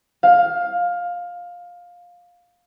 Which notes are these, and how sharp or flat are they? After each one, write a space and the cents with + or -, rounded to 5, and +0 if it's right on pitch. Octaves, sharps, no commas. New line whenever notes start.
F5 +15